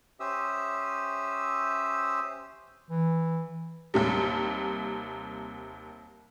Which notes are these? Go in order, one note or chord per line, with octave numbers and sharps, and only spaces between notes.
C#4 G4 C5 E5 D#6 E6
E3
D#2 C3 G3